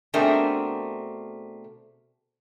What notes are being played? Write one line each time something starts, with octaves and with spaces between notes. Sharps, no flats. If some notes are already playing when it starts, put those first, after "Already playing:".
B2 A3 C4 D4 G#4 A#4